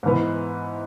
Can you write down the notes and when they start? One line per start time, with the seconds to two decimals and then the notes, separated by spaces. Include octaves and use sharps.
0.03 G#2 E3 B3